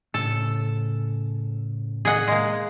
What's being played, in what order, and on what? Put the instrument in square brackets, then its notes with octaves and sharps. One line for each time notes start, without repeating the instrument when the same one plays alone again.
[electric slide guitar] A2 C#3 [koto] A4
[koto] G#4 D#5 F#5
G#3 A#3